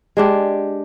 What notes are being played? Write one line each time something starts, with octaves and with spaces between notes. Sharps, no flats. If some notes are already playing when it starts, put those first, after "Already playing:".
G#3 D4 G4